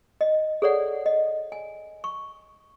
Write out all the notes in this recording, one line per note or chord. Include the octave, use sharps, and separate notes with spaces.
D#5
G#4 A4 C#5 D5 F#5
D#5
G#5
C#6